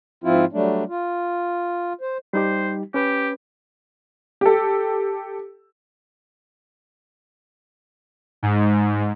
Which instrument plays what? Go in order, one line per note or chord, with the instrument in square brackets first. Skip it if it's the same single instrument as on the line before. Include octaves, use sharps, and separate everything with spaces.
[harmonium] G#2 F3 C4 E4 F4
F#3 G3 A3 D4
F4
C5
[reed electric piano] G3 D#4 G4 [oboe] C5
[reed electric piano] C#4 B4 [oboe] G4
[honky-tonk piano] G4 A4
[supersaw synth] G#2